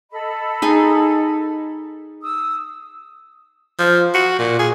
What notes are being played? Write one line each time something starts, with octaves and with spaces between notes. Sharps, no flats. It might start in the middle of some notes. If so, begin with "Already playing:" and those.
A4 D#5 B5
D#4 G#4
D#6 E6
F3
F#4
A#2
G#4